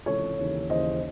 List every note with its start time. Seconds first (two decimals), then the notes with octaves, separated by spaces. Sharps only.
0.06 C#2 C3 E3 A4 C#5
0.39 D#2 C#3 E3
0.70 D#2 C#3 E3 C5 D#5